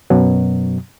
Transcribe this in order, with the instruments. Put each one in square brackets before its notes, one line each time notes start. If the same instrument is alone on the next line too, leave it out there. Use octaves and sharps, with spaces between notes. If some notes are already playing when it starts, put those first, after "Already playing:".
[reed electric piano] F#2 B2 F#3